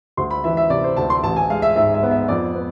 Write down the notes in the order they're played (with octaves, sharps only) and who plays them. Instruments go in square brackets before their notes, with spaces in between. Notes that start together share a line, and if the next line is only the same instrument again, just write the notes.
[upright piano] D2 C6
B5
E3 E5
E5
C3 D5
C5
D2 A5
C6
A1 A5
G#5
G#3 F5
E5
G#2 E5
E5
B3
E5
F2 D5
B3